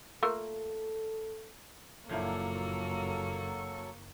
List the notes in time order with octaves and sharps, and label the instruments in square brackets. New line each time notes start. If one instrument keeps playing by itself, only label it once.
[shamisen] A3 A#3 F4 [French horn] A4
[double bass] F#1 [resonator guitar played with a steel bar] A#2 F3 E4 [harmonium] F#3 A4 [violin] A#3 C#6